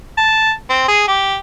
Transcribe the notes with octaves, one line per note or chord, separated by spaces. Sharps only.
A5
C4
G#4
G4